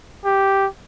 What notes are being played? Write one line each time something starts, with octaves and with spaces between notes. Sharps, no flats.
G4